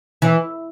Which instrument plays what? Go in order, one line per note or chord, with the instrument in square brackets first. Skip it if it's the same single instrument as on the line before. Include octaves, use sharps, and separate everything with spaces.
[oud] E3